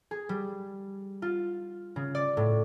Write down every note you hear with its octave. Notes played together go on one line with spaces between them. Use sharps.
G#4
G3
F4
C#3
D5
A2